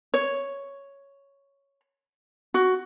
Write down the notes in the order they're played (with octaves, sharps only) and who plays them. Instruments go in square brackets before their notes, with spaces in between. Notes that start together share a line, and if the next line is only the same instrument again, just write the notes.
[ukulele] C#5
F#4